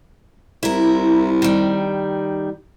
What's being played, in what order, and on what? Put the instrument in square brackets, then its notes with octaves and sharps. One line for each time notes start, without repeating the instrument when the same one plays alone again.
[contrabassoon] C2 [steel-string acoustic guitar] E4 A#4
[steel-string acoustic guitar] D#3 G3